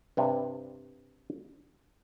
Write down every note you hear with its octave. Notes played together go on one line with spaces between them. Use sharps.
G2 C3